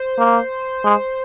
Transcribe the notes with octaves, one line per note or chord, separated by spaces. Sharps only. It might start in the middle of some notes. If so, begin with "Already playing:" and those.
Already playing: C5
A#3
G#3